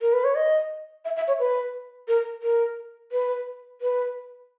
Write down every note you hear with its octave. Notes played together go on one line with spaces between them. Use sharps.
A#4
B4
C#5
D#5
E5
E5
C#5
B4
A#4
A#4
B4
B4